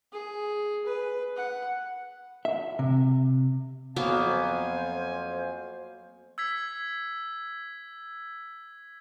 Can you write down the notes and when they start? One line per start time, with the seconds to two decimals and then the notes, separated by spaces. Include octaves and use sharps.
0.12 G#4
0.86 B4
1.37 F#5
2.45 E5
2.79 C3
3.96 F2 F#3 A#3 B3 C5 F5 G#5
6.38 E6 G#6 B6